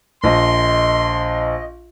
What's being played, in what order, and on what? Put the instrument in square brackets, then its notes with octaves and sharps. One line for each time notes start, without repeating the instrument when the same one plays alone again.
[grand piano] A#1 [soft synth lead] D#5 [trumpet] C6